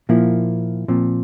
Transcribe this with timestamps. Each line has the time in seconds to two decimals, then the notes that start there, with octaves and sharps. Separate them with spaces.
0.09 A#2 F3 A#3 E4
0.88 A#2 F3 C4